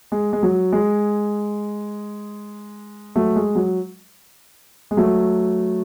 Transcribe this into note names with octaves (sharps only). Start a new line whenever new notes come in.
G#3
G#3
F#3
G#3
F#3 A3
G#3
F#3
G#3
F#3 A3